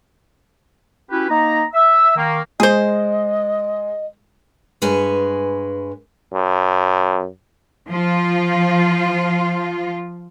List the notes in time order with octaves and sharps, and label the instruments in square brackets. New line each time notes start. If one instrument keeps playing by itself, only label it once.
[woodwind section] C#4 E4 F#4 G4 B4
A#3 D#4 D#5 A#5
E5 E6
D#3 A#3
[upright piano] G#3 [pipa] G#4 C5 [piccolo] D#5
[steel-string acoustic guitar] G2 G#3 B4 C#5 G#5
[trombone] F#2
[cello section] F3 F4